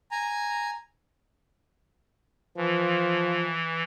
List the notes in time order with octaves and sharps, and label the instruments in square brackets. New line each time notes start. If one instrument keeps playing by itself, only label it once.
[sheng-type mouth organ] G#5 A#5
[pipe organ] E3 [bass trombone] F3